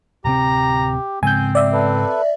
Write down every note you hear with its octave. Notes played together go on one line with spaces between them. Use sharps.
D1 C3 C4 G4 A#5
G#2 C#3 G#3 C4 G#5 G6
D5 E5
A4 B4